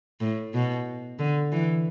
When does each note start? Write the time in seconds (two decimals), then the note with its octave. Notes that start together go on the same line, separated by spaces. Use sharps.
0.21 A2
0.54 B2
1.19 D3
1.52 E3